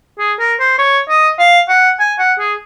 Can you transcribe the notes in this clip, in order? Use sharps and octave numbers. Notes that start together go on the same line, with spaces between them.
G#4
A#4
C5
C#5
D#5
F5
F#5
G#5
F#5
G#4